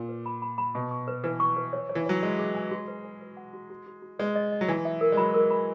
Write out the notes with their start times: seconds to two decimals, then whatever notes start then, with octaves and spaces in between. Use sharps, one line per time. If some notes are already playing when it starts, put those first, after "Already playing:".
Already playing: A#2
0.09 B4
0.26 B5
0.42 B5
0.58 B5
0.75 B2 C#6
0.91 C#6
1.08 B4
1.24 E3 B4
1.40 C#6
1.57 B4
1.73 C#5
1.89 C#5
1.95 E3
2.06 F#3 C#5
2.22 G#3 C#5
2.39 G#4
2.55 G#5
2.71 F#4
2.88 B4
3.04 B4
3.21 B4
3.37 F#5
3.53 F#4
3.70 F#4
3.87 F#4
4.02 F#4
4.19 G#3 B4
4.35 D#5
4.52 D#5
4.61 F#3
4.68 E3 G#5
4.85 E5
5.01 A#4
5.12 G#3
5.17 F#3 B5
5.34 A#4
5.51 B5